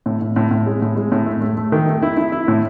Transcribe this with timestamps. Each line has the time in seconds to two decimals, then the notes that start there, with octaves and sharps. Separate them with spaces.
0.06 A2
0.22 A2
0.36 A2
0.51 A2
0.66 G#3
0.82 A2
0.96 G#3
1.12 A2
1.26 A3
1.41 A3
1.57 A3
1.72 D#3
1.87 A3
2.02 E4
2.17 E4
2.32 E4
2.48 A2